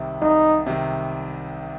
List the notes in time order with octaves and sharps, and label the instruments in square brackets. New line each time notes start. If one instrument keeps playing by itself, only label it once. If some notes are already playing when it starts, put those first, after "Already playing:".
Already playing: [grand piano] C2 C3 D#3
[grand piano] C2 [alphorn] D#4
[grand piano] C3 D#3